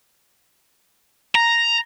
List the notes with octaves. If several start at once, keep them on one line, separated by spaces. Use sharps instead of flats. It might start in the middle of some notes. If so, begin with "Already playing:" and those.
A#5